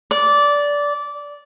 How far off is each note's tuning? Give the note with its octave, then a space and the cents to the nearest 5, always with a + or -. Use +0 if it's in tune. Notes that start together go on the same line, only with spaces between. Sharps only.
D5 -15